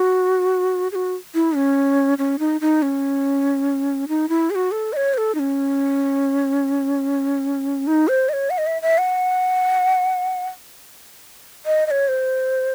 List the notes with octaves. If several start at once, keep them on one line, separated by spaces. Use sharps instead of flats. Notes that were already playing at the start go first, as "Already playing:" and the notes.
Already playing: F#4
G#4
F#4
E4
C#4
C#4
D#4
D#4
C#4
D#4
E4
G#4
F#4
A4
D#5
C#5
C5
A4
D#4
C#4
D#4
C5
D#5
C#5
F#5
D#5
E5
E5
F#5
D#5
D#5
C#5
C5